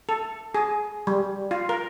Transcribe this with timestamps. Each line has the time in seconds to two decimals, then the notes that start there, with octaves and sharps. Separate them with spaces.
0.09 A4
0.55 G#4
1.07 G3
1.51 F4
1.69 A#4